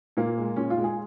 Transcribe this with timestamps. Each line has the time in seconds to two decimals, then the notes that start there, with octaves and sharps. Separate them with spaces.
0.17 A#2 A#3
0.38 G#3
0.56 A#2 C#4
0.70 F4
0.77 G#3
0.84 G#4